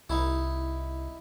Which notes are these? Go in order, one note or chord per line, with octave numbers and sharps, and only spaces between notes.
C2 D#4 E4